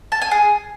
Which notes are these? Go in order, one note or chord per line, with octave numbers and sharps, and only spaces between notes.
A5
G#5
G#4